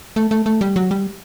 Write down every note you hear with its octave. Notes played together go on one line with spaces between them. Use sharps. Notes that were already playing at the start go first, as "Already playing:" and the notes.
A3
A3
A3
G3
F#3
G3